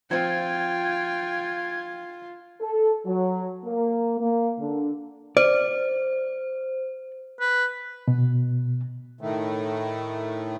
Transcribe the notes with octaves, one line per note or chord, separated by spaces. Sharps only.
F3 C4 F4 G5 G#6
A4
F#3
A#3
A#3
D3
C5 D5
B4
B2
A2 D#3 A3